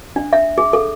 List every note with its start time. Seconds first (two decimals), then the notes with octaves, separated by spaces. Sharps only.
0.16 D4
0.33 E5
0.58 G#4
0.73 A4